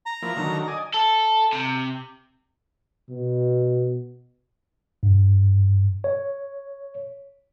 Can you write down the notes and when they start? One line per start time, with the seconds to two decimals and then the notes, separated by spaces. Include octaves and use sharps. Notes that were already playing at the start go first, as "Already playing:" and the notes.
0.06 A#5
0.22 F3 A#3 E4
0.37 D3 D#3 F#3
0.68 D5 D#5 G#5
0.94 A4
1.53 C3
3.10 B2
5.03 G2
6.04 C#5